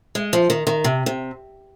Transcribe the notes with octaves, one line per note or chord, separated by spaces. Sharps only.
G#3
F3
D#3
D#3
C3
C3